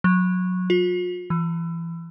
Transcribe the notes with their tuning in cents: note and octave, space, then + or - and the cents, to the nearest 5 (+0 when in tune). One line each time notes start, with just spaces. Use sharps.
F#3 -20
F4 +40
E3 +25